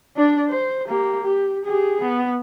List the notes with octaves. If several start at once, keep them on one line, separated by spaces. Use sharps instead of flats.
D4 D5
C5
A#3 G4
G4
G4 G#4
B3